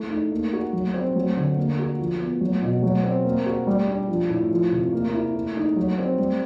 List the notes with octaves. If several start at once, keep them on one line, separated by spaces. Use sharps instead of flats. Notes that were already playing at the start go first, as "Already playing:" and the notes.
Already playing: A3 E4
D#4
A#3
F#4
F#3
C4
F#3
D3
A#3
F#4
F3
B3
F#3
B2
F#3
C4
A#3
F#4
G3
D4
F3
A2
F3
C3
A#3
E4
A3
D#4
F#3
C4
G3